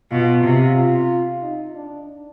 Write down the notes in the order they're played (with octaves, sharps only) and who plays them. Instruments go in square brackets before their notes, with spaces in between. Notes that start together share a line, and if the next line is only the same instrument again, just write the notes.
[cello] B2 [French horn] F4
[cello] C3
[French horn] F4
D#4
D4